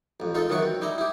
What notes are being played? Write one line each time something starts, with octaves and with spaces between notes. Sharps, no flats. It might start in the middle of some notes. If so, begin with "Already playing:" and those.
A1 F2
G#3 D#4 F4 A4
F#2 D#3 E3 C#4 F#4 C#6
C4
G3 D#4 E4 A#5
E4 G4